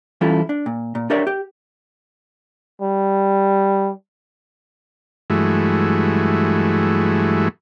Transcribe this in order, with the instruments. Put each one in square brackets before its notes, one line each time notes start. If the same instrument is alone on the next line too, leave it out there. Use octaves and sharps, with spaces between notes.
[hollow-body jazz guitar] E3 G3 C#4 E4 F4 A4
D4
A#2
A#2
D4 G4 A#4 C#5 D5 E5
G4
[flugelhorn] G3
[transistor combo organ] G2 E3 F#3 G#3 A3